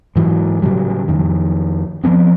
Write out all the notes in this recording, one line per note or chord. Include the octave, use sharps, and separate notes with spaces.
G#2 E3 F#3
A2 C#3 F#3 G3
F2 D#3
F3 F#3 B3 C4